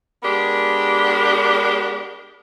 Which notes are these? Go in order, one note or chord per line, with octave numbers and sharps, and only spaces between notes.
G#3 B3 D4 G4 A#4